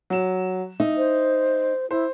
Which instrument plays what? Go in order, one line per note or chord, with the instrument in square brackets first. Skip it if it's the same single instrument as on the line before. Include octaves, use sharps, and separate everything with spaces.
[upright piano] F#3 E7
[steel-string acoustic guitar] D#4 [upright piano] E5
[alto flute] C5
[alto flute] E4 [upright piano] C5